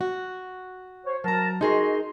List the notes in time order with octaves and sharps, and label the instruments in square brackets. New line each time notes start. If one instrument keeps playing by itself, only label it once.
[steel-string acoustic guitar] F#4
[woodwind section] C5 C#5
[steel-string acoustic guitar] F#3 A#5 [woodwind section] A#4 A5
[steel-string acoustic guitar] D#4 G#4 A#4 [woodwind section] F#4 D#5 C6